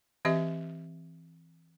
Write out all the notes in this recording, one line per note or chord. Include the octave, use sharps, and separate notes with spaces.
E3 C4 G4 D#5 E5